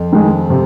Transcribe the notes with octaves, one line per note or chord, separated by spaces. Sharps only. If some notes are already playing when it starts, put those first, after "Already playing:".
Already playing: F2 F3
D#3 G#3
C3